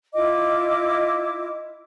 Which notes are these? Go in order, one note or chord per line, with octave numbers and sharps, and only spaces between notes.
E4 F4 D#5 D6